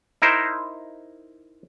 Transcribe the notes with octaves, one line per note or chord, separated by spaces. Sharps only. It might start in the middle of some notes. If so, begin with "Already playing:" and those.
D#4 E4 A#4 C5